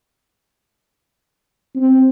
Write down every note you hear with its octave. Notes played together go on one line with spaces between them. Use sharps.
C4